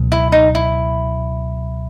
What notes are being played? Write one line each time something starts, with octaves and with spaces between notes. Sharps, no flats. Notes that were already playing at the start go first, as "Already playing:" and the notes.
Already playing: C#2 B2 F#3
E4
D#4
E4